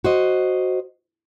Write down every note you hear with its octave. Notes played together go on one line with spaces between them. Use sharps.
F#4 C5 D#5